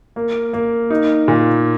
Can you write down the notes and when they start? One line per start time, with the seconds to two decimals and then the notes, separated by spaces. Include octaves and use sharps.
0.16 A#3
0.53 A#3
0.90 D#4
1.28 A#2